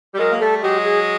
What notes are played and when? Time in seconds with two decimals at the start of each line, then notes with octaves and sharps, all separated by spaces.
0.14 G3
0.19 F#3 G#3 A#4
0.30 A#3
0.39 G3 A3 A4
0.62 F#3 G#3 G4
0.84 G#4